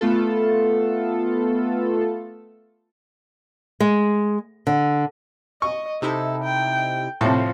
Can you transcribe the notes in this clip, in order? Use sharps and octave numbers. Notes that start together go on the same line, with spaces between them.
A3 B3 F4 A4
G#3
D3
D#5 C#6
C3 D#4 E4 A4
G5
A2 C3 F3 A4